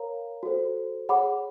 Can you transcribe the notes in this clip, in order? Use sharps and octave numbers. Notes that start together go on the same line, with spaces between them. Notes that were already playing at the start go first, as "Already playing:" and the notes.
Already playing: A#4 C#5 F5 A#5
F#4 A4 C5
G#4 C#5 F#5 B5 D6